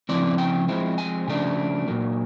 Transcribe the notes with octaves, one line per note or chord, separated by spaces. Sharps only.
C#3 F3 A3 C4 E4 D5
G5
F3 G#3 C4 E4
G#5
C#3 F3 A3 D4
A#2 F#3 A#3